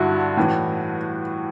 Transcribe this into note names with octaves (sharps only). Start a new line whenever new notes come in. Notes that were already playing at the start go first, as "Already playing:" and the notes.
Already playing: G2 D3 E4 F#4
A2 E3